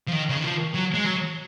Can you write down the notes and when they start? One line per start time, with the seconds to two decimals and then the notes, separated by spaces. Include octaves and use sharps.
0.08 F3
0.13 D#3
0.29 C#3
0.37 D#3
0.44 F3
0.75 F#3
0.94 G#3
1.06 F#3